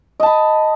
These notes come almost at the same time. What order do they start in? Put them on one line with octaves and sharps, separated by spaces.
D#5 A5 B5